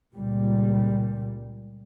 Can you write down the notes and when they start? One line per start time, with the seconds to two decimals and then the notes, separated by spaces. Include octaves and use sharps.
0.15 C#2 A#2 G3